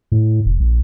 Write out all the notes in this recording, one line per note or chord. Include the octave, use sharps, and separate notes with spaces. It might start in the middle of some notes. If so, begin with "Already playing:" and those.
A2
F1
A#1